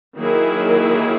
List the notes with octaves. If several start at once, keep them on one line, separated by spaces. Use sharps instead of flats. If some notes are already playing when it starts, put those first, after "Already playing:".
D#3 F#3 A#3 E4 G#4